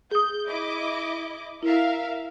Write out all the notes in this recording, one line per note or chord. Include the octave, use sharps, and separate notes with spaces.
G#4 D#6 G6
E4 D#5 D6
E4 A#4 E5 F5